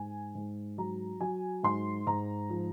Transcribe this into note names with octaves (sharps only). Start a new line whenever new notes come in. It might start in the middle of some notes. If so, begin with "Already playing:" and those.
Already playing: G#2 G#5
G#2
F#3 A#5
F#3 G#5
G#2 C6
G#2 A#5
F3